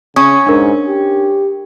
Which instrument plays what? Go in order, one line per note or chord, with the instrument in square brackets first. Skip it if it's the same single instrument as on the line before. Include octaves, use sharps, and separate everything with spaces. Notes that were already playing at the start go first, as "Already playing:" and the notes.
[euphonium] C#3 [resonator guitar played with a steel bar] C#4 [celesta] D#6
[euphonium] G#2 [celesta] D4 A#4
[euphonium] G4